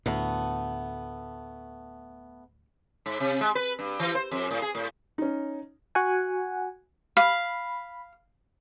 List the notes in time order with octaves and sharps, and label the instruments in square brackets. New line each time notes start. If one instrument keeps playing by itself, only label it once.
[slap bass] D2 A2 [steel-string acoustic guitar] A3 B3
[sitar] G#2
C3
G#3
B4
G2
E3
C5
F2
A2
G#4
A2
[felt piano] C#4 D#4
[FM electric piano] F#4 F#5 G#5
[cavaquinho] F5 [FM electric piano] B5